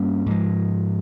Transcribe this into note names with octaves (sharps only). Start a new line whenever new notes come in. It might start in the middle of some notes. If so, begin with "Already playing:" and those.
Already playing: G2 G3 A#3 C#4
G#2 F3 G#3